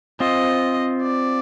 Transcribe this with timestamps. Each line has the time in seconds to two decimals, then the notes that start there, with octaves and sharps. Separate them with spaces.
0.20 C4 F4 C5 D#5
1.03 D5